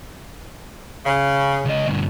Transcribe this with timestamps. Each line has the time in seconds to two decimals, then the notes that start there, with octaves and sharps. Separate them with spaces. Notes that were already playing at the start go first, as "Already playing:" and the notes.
1.06 C#3
1.65 C#2 D#5
1.87 D2 G2